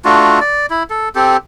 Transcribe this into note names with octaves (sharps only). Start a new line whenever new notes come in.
A3 D4 F4 F#4
D5
E4
A4
C4 G4 A4